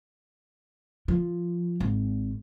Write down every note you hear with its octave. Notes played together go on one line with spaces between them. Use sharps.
F3
G#1